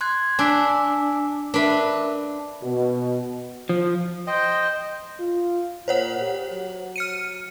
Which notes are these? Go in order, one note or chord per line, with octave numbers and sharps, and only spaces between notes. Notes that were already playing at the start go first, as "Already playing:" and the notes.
C6 F#6 G#6
D4 G#5 E6 B6
D4 A#4 B4 E5
B2
F3
C5 D#5 G5
F4
A#2 C5 C#5 F#5
G4
F#3
F6 C#7 D#7